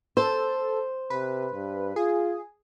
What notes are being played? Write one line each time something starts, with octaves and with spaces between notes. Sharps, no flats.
A4 C5
C3 B4
G2
F4 G#4